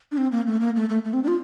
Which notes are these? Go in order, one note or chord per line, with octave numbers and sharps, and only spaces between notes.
D4
C4
A#3
A3
A#3
A3
A3
A3
C4
D4
F4